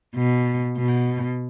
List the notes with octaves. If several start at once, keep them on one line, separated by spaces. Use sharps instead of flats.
B2
B2